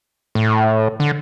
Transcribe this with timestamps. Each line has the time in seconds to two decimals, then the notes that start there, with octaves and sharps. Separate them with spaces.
0.35 A2
1.00 D3